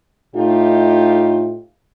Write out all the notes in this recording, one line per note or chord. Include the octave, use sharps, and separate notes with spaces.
A2 A3 D#4 F4 G4